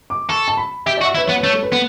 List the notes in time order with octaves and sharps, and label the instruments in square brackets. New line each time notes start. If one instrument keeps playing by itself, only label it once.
[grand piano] D6
[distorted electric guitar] A4 [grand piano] C#6
[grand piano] A5
B5
[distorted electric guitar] G4 [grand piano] E5
[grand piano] D5
[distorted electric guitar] F#4
[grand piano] E5
[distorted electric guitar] E4 [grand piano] B4
[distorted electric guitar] B3 [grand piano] C#5
[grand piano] B4
[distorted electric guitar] A3 [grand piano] C#5
[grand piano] A4
B4
[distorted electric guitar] B3